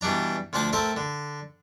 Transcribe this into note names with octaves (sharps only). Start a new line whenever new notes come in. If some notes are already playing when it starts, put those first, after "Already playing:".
B2 E3 G3 D4 A#5
D2 F3 D4 D5 D6
A3 C4 A4 A#4
D3